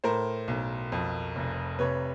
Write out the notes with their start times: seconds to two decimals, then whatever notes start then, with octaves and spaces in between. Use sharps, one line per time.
0.04 A2 A#4 C5
0.48 B1
0.92 F2
1.36 F1
1.79 C3 B4 C#5